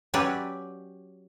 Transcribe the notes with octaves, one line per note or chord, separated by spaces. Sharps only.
F#3 C#4 G4 B4 D5 E5